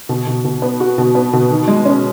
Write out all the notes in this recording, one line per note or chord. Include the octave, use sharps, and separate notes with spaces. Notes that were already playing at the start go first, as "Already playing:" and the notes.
B2
B2
B2
B3
F#4
B2
B3
B2
D#3
G#3
C#4